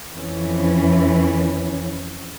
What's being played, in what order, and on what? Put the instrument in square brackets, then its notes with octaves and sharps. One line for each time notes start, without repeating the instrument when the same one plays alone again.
[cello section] F2 E3 C#4